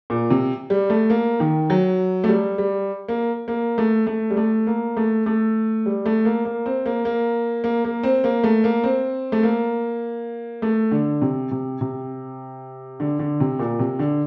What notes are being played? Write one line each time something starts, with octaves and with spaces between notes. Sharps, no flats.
A#2
C3
G3
A3
A#3
D#3
F#3
A3
G3
G3
A#3
A#3
A3
A3
G3
A3
A#3
A3
A3
G3
A3
A#3
A#3
C4
A#3
A#3
A#3
A#3
C4
A#3
A3
A#3
C4
A3
A#3
A3
D3
C3
C3
C3
D3
D3
C3
A#2
C3
D3